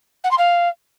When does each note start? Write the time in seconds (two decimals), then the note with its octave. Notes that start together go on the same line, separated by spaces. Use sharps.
0.24 F#5
0.31 C6
0.38 F5